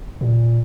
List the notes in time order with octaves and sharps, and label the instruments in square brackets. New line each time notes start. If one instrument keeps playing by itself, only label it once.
[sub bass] A#2